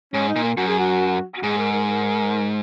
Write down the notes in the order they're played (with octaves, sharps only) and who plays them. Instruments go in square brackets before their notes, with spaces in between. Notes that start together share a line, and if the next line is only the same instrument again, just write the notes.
[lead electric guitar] G#2 [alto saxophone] C#4
[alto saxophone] D#4
[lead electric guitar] A#2
[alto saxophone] A#3
[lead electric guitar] F#2 [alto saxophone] F#4
[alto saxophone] G#4
F#4
F#4
[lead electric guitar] G#2 [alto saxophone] G#4
[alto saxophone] A#4
A#4
A#4